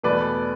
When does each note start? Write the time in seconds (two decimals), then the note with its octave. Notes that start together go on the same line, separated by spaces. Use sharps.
0.03 E2 B2 A3 B4 D5